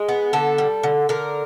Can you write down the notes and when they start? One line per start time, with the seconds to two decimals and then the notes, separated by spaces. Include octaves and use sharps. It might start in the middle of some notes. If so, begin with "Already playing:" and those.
Already playing: G#3 G#4
0.09 B3
0.33 D3 A4
0.58 G3
0.83 D3
1.09 D3 A#4